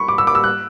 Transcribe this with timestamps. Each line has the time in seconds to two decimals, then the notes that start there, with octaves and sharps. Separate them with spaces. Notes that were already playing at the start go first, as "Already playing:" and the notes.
Already playing: B5 C#6
0.08 D6
0.18 E6
0.27 D6
0.35 E6
0.44 F#6